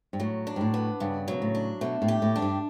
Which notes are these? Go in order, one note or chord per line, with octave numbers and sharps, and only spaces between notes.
G2
A2 F#3
D4
G2
A2
B3
G2 C#3
B2 F#3
A2
D4
B2 A3
A2
G4
A2
F#2 D4
G2